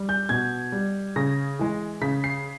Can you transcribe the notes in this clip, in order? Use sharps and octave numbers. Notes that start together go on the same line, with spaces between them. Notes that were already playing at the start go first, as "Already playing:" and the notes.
Already playing: G3
G6
B2 G#6
G3
C#3 A#6
E3 G#3
C#3 B6
C7